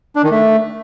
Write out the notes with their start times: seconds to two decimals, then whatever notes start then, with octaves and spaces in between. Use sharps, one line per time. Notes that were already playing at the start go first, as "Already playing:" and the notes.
0.16 D4
0.23 D#3
0.31 A3